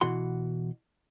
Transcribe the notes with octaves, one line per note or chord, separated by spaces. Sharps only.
B2 E3 F#4 F#5 C6